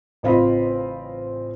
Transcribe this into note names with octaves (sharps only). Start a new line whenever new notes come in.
A1 C#3 C4 F4 D#5 B5